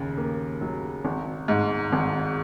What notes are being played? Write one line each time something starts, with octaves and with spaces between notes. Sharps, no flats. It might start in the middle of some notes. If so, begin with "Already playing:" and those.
Already playing: D#2 C#3
A#3
F#3
G#1
G#2
G#1